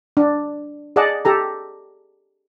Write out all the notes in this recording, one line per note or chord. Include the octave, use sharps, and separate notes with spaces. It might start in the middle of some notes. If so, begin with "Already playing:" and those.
D4
G#4 D5 D#5 F#5 A5
G4 A4 A#5